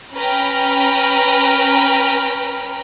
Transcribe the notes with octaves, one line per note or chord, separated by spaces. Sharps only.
C#4 B4 G5 A#5 B5 F6